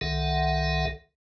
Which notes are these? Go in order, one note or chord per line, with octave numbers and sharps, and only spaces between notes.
C2 D#3 A4 E5 F#5